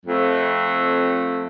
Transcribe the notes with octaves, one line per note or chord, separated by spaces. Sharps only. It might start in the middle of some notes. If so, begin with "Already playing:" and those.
F2 A3